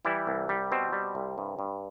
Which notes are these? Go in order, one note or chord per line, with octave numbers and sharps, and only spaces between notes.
E3 G3 E4
C2
G3
B2 C4
G3
C2
G2
G2